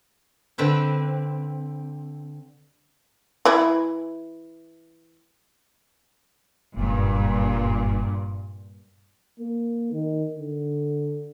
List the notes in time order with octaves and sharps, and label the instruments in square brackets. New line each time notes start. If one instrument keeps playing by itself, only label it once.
[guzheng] D3 C4 B4 G5
[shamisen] E3 E4
[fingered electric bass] F#1 [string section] G2 A#2
[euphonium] A#3
D#3
D3